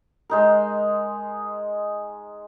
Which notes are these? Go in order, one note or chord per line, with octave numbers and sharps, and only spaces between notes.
G#3 D#4 A#4